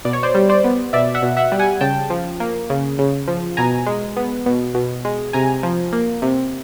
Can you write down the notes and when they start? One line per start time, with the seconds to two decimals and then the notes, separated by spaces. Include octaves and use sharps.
0.05 B2 D5
0.13 C#5
0.23 C5 D5
0.34 G3
0.49 C5 D5
0.64 B3
0.93 B2 D5 E5
1.15 E5 F#5
1.22 B2
1.37 E5 F#5
1.52 G3
1.59 F#5 G#5
1.81 C#3 G5 A5
2.10 F3
2.40 A#3
2.70 C#3
2.99 C#3
3.28 F3
3.57 B2 G#5 A#5
3.86 G#3
4.16 B3
4.46 B2
4.74 B2
5.05 G#3
5.33 C3 G#5 A#5
5.63 F3
5.92 A#3
6.22 C3